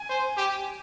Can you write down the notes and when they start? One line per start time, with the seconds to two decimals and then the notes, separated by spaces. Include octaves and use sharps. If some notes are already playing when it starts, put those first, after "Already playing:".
Already playing: G#5
0.09 C5
0.37 G4